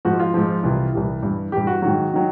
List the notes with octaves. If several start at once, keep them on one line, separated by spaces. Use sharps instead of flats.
G#2 F3 F#4
F4
G#2 F3
C2 C3 E3
C2 C3 E3
G2 E3
G2 E3 G4
F#4
G#2 D#3 F#3 F#4
D#3 F#3